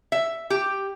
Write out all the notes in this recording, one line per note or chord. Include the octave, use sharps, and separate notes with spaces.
E5
G4